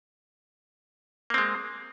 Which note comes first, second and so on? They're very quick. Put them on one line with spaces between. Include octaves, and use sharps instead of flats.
A#3 C4 G#3